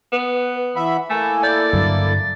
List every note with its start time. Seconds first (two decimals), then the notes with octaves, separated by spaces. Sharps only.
0.12 B3 B4
0.76 E3 E5 F#5 B5
1.10 A3 A#3 E4 A4 G#5
1.44 D5 G6
1.73 G2 D3 F#3 A6